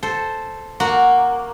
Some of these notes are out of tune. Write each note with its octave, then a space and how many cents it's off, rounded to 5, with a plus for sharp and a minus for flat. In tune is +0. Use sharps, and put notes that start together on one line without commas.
A4 +0 C5 +0
A#3 +0 F#4 -10